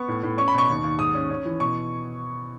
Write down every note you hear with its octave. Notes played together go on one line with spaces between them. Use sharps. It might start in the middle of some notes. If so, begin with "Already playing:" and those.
Already playing: B3 C#6
A2
A2
C#4 C#6
B5
B2 C#6
D#2
D#2
G#2 D#6
C#4
C#4
E3
B2 C#6